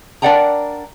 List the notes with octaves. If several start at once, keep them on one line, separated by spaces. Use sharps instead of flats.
D4 A#4 D5 F#5 G5 A#5